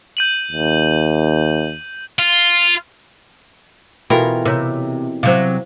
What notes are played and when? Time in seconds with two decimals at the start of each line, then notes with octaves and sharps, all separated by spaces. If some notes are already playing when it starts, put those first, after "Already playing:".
0.17 G6 D#7 F#7
0.52 D#2
2.19 F4
4.10 B2 E3 F4 A4 A#4 G5 B5
4.45 C3 A#4 C#5 A#5
5.23 C3 F#3 C5 F5